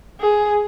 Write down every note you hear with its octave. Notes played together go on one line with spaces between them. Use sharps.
G#4